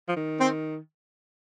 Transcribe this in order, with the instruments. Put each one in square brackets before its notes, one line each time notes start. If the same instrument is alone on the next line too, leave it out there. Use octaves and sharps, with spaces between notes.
[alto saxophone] F3
D#3
[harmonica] C4